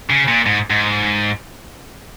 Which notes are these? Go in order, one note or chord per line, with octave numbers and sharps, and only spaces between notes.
C#3
A#2
G#2
G#2